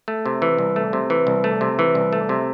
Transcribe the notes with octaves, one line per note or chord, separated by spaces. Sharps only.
A3
C3
E3
C2
A3
C3
E3
C2
A3
C3
E3
C2
A3
C3